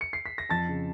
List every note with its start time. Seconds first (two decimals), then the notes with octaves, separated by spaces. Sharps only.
0.01 C#7
0.13 C7
0.26 B6
0.38 A#6
0.49 F2 A5 A6
0.69 C#3